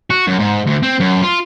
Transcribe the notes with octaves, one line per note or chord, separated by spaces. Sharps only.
F#4
F#2
G#2
D2
C4
F#2
F4